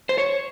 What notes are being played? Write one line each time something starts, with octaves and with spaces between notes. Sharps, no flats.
C5
C#5